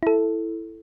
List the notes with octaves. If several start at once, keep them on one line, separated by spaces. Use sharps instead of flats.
E4 A4